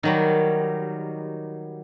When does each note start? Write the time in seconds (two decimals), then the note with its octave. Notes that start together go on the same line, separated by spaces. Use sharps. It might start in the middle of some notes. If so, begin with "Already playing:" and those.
0.03 D#3 F#3 G3